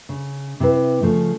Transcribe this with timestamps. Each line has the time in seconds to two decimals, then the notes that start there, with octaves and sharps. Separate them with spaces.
0.09 C#3
0.60 C3 C4 E4 B4
1.02 C#3 F3 A3